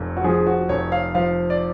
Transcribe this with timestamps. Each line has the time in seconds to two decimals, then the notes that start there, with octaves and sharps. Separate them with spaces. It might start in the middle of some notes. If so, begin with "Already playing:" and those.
Already playing: F1 F2
0.17 F#4
0.24 F3 G#4
0.47 F#4
0.69 F1 C#5
0.92 F5
1.15 F3 F5
1.50 D5